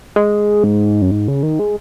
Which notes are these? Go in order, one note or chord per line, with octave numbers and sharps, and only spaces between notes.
G#3
G#2
F#2
G#2
C#3
D#3
G#3